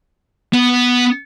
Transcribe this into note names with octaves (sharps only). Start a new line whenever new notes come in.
B3